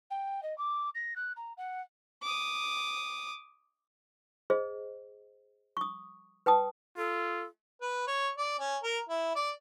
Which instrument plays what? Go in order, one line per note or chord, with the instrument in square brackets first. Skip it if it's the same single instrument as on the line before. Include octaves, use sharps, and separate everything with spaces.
[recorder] G5
D#5
D6
A#6
F#6
A#5
F#5
[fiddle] D6 D#6
[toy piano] G#4 C5 D#5
C#6 D#6
B4 G5 A5 D#6
[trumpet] F4 [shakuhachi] A4
[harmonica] B4
C#5
D5
C#4
A#4
E4
D5